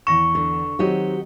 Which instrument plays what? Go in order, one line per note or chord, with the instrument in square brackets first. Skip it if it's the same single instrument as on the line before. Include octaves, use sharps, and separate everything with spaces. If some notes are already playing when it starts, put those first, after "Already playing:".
[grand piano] E2 A#6 E7 [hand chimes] C#6
[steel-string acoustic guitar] D3
[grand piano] D#3 F#3 C4 [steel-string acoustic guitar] F#4 G4 D#5